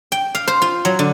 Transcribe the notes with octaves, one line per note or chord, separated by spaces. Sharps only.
G5
F5
C5
F4
F#3
D3